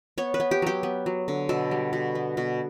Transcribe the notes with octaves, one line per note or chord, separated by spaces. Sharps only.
B3 C#5
B4
B3
G4
F#3 G4
B3
F#3
D3
B2 A4
G3
B2
B3
B2